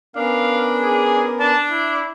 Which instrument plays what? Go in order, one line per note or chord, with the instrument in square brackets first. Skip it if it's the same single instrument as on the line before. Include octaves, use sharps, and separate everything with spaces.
[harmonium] B3 C#4 A#4 [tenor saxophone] D4 [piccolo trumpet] F5
[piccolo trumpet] G#4
[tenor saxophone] D4 [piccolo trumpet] A5
[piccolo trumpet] E4